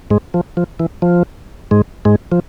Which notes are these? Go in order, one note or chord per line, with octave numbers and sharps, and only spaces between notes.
G#2 G#3
F3
F3
E3
F3
G#2 G#3
G#2 G#3
F3